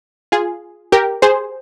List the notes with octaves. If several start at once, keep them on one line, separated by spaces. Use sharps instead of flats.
F4 G#4
G4 A#4
G#4 C5